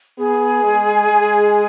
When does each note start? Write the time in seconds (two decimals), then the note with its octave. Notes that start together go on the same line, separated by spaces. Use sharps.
0.18 B3 G#4
0.63 G#3
1.08 G#3